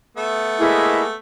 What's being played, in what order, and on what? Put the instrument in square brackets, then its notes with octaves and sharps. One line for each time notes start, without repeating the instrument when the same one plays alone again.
[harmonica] A3 B3 E5
[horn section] G#3 A#3 G#4 [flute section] E4 B4 D#5